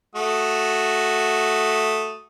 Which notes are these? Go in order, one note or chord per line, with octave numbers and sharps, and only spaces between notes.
A3 F#4 D#6